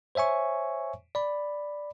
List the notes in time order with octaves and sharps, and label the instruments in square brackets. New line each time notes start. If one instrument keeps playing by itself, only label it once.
[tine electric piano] C5 C#5 E5 G#5 C#6
D5 B5